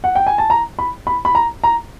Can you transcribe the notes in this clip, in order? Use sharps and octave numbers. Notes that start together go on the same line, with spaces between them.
F#5
G5
G#5
A5
A#5
B5
B5
B5
A#5
A#5